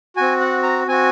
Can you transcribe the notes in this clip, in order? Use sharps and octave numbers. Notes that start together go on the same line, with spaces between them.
C4 F#4 G#5
F#5
A#5
C4 F#4 G#5